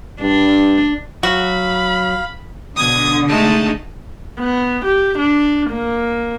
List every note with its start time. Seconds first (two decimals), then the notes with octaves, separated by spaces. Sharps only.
0.21 G2 D4
1.23 F#3 F#4 F5 B5
2.76 B2 D3 D#6 G#6
3.28 G#3 A3 D#4 A5
4.40 B3
4.85 G4
5.18 D4
5.70 A#3